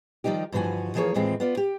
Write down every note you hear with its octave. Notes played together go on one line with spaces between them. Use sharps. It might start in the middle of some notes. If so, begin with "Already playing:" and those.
D#3 F3 G3 D#4 G4
G2 D3 E3 F3 F#4 G#5
E3 F3 A#3 G#4 C#5
D#2 A2 E3 G#3 C4 F4
B3 F4 D5
G4